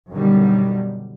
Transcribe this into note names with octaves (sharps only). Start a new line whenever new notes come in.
F#2 B2 D3 D#3 G3